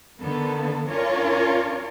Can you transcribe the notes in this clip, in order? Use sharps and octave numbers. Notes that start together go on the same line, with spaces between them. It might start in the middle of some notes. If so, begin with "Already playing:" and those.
D3 D#3 A#3 B3 A4
C#4 D4 F4 A#4 C#5 D5